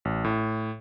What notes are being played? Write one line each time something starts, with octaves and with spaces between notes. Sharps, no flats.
A1
A2